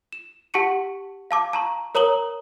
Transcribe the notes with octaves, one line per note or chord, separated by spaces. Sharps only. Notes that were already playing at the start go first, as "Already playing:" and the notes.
E7
G4 F#5 A5 C#6 C#7 D#7
F5 A5 D6
A5 A#5 C#6
A#4 C#5 A#5 D#6 F#7 G7